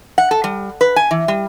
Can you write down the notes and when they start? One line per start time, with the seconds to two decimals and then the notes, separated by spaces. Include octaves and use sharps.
0.18 F#5
0.31 A4
0.44 G3
0.81 B4
0.96 G#5
1.11 E3
1.28 G3